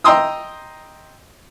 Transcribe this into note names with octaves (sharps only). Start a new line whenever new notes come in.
D#5 G5 A#5 C6 D#6 E6